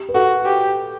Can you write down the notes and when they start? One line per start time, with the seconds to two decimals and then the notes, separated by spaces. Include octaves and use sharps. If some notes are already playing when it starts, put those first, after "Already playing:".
Already playing: G4
0.09 B4
0.14 F#4 A4
0.46 G4